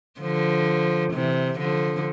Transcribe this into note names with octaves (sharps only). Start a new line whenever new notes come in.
D3 F3
C3 E3
D3 F3